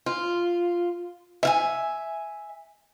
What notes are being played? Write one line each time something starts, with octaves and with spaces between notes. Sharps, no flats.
F4
E5 F5 G#5